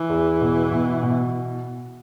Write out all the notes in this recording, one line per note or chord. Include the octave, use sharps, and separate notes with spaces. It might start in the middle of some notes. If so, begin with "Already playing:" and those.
Already playing: E3
E2
B2
B2
B2